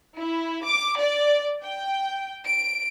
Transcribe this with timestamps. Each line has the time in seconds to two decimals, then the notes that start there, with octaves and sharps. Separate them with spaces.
0.19 E4
0.66 D6
1.00 D5
1.63 G5
2.46 D7